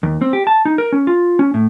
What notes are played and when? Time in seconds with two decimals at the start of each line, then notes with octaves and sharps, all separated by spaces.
0.03 D#2
0.22 C4
0.33 G4
0.47 A5
0.65 D#4
0.78 A#4
0.92 C#4
1.07 F4
1.39 C#4
1.54 A2